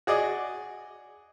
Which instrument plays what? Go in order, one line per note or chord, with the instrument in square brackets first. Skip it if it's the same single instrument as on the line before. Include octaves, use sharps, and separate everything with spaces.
[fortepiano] F#4 G#4 D5 D#5